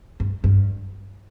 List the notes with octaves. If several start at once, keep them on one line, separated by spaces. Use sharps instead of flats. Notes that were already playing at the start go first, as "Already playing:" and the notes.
G2
G2